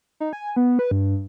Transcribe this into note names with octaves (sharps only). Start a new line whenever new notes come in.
D#4
G#5
B3
B4
G2